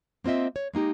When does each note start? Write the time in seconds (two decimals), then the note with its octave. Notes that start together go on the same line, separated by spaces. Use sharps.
0.24 A#3 C4 F4 D#5 E5
0.56 C#5
0.74 G#3 A#3 D#4 G4